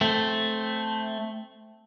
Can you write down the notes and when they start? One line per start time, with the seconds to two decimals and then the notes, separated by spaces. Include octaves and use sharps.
0.01 A3 C4